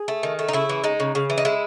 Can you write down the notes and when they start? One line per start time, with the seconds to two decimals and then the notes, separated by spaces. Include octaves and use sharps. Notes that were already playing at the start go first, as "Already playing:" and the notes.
Already playing: G#4
0.08 A3
0.23 D#3
0.39 A3
0.48 D#4
0.53 C#3 E4
0.69 E3
0.84 G#3 D#4
1.00 C#3
1.15 C#3
1.30 E3
1.38 D#4
1.45 G#3 E4